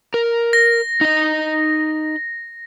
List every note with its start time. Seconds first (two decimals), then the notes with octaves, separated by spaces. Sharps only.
0.14 A#4
0.53 A#6
1.01 D#4 D#5